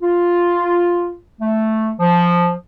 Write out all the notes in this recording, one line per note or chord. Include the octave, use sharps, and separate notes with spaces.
F4
A3
F3